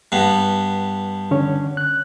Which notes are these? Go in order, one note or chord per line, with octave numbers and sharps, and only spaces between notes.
G2 B3
D3 C#4 C#5
F#6